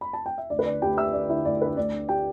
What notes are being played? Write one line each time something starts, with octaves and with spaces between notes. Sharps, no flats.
B5
A5
G5
E5
D2 D5
B4
D3 D5
D2 G4 G5
D3 E5 E6
D2 D5
D3 E4 E5
D2 D5
D3 B4
D2 D5
D3
G4 G5